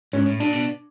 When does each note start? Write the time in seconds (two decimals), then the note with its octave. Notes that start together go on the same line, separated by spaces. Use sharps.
0.13 G#2 C#4
0.26 A2
0.40 A#2 D4
0.53 B2